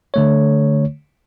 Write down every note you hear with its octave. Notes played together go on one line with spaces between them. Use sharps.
D3 A3 C#5